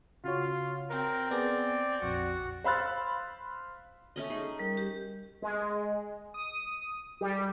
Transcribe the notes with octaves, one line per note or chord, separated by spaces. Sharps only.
C#3 F4 F#4 C#5
C4 A#4
B3 G#4 D5
A#1 F2 F#4
C5 F5 B5 E6 F#6 A6
A3 C#4 D#5
D#4 G#4
G3 A#4
G4
G#3
D#6
G3